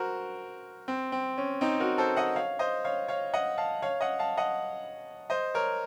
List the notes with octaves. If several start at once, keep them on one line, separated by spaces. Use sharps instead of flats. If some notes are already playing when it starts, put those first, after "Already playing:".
Already playing: F#4 A#4 C5
C4
C4
C#4
C4 D#4
F#4 A#4
A4 C5
D#5 F#5
C#5 F5
C5 D#5
C#5 F5
C#5 F5
D#5 F#5
F5 A5
C#5 F5
D#5 F#5
F5 A5
D#5 F#5
C5 D#5
A#4 C#5